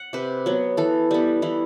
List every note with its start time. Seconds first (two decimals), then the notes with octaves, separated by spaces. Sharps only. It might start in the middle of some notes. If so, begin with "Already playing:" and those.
Already playing: F#5
0.13 C3 B4
0.46 F#3 B3
0.77 E3 A4
1.11 G3 B3
1.42 E3 E4